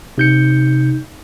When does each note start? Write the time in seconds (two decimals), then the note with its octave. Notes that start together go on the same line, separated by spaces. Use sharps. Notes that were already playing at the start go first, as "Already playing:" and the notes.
0.18 C3 D#4 G6 C#7